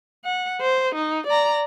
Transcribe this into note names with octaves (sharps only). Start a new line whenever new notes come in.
F#5
C5
D#4
D5 A#5